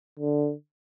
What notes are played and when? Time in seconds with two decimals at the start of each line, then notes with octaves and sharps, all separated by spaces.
0.20 D3